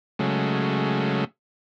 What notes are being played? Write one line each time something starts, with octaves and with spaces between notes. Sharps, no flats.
C#3 F#3 G#3 A3